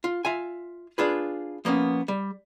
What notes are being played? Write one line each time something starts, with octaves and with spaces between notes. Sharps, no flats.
F4
F4 E5 G#5
D4 F4 G#4 B4
F3 A#3 B3 C#4
G3